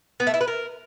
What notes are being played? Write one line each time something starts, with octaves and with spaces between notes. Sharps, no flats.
B3
A3
E4
B4
A#4